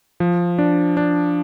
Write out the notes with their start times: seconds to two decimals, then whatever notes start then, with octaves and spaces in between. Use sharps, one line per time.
0.20 F3
0.58 D4
0.97 D4